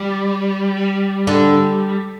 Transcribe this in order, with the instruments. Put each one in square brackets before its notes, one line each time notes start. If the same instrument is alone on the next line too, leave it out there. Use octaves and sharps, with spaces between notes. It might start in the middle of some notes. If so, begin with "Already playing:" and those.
Already playing: [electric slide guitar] G3
[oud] D3